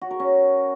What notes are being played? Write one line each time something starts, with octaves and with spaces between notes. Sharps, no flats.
F#4
A#4
C#4